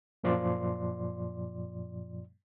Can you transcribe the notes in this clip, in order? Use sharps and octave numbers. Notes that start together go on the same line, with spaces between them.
F#2 A#2 F3 D5 C6